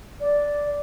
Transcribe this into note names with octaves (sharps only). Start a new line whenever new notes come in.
D5